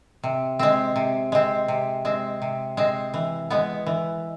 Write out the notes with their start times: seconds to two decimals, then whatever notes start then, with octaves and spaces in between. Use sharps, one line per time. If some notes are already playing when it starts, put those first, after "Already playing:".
0.24 C3
0.59 G#3 C4
0.96 C3
1.32 G#3 C4
1.68 C3
2.05 G#3 C4
2.42 C3
2.77 G#3 C4
3.14 E3
3.50 G#3 B3
3.86 E3